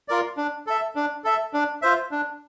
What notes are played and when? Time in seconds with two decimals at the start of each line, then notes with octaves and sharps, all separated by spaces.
0.08 F4 A#4 D5
0.37 D4
0.67 A4 E5
0.96 D4
1.24 A4 E5
1.54 D4
1.82 F4 C5 E5
2.11 D4